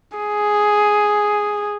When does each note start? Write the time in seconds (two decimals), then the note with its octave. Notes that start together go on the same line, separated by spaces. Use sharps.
0.18 G#4